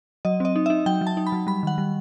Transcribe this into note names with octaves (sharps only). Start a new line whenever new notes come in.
F#3 D#5
C4 D#5
D#4
D#4 E5
F#3 G5
F#3
A5
D#4
B5
F#3
G3 B5
D#3 F#5
G3